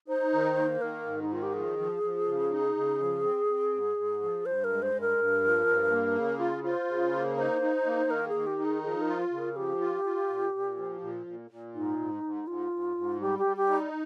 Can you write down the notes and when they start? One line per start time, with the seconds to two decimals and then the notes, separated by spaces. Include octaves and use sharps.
0.08 D#4 C5
0.33 D#3
0.57 A#3
0.81 D#3 A#4
1.06 G#2
1.22 D#4
1.29 D#3 F4
1.43 G4
1.54 F3 G#4
1.79 F3
2.03 F3
2.27 C#3
2.51 D#4
2.75 C#3
3.00 F3
3.23 C4
3.49 C4
3.73 G#2
3.97 G#2
4.22 F3
4.46 G2 C5
4.64 A#4
4.70 G#3
4.82 C5
4.94 G2
5.01 A#4
5.18 G2
5.43 F3
5.67 G2
5.91 A#3
6.15 C#3
6.39 F4
6.64 F4 C5
6.89 C#3
7.13 A#3
7.37 D#4 C5
7.61 D#4
7.86 A#3
8.10 D#3 A#4
8.29 G#4
8.35 D#3
8.47 G4
8.59 D#4
8.65 G#4
8.83 F3 G#4
9.01 A#4
9.08 F4
9.31 C#3
9.38 A#4
9.56 F3 G4
9.81 F4
10.04 F4
10.29 A#2
10.54 A#2
10.77 F3
11.01 A#2
11.26 A#2
11.51 A#2
11.75 G#2 D#4
11.99 G#2
12.23 G#2
12.47 G#2 F4
12.72 G#2
12.97 G#2
13.20 G3 G4
13.39 G4
13.45 G3
13.57 G4
13.69 D#4